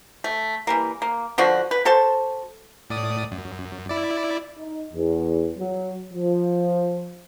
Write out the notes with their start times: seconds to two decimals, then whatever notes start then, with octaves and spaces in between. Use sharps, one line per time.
0.24 A3
0.67 E3 G3 A#3
1.02 A#3
1.38 D3 F3 D4 F#4
1.71 B4
1.85 F#4 A4 C5 A5
2.90 A2 D5 D#6
3.32 F#2
3.89 E4 D5
4.58 D#4
4.94 E2
5.58 F#3
6.13 F3